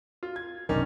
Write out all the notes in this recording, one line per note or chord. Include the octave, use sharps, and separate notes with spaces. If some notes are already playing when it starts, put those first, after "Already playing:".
F4
G#6
B1 F#2 C3 D#3 C#4 D4